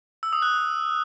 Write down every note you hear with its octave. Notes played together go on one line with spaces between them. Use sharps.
E6
D#6
F#6